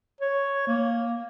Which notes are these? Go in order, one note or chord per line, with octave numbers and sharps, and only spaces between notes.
C#5
A#3